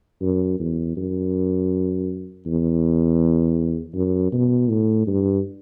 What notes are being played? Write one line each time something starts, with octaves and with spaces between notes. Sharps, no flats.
F#2
E2
F#2
E2
F#2
B2
A2
G2